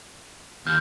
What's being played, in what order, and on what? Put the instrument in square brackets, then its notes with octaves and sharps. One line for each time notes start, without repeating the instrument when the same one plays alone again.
[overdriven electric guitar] D#2 [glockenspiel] F6 G6